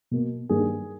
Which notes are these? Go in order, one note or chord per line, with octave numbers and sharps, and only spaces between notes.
B2 A#3
G2 D#3 A#3 G#4